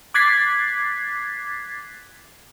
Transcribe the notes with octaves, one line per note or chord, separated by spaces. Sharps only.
D6 F#6 G#6 A6 B6 C7